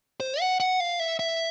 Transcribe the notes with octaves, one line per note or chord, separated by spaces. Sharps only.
C5
F#5
F#5
F5
E5
E5